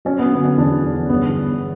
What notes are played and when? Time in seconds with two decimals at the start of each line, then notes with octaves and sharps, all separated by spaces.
0.05 F#3 C#4
0.19 B3
0.32 D3 B3
0.45 C#4
0.58 E2 D4
0.83 E2
1.09 G1 B3